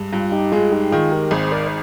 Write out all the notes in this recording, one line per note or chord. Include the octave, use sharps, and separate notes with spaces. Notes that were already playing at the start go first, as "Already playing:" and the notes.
Already playing: G2 G#3
G2 F4
D#4 G4
G#3 F4 G#4
D#4 G4
D#3 F4 G#4
G4 A#4
G#1 G#4 C5
A#4 D5